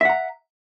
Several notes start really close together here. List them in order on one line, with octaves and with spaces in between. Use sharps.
E5 F#5 A#5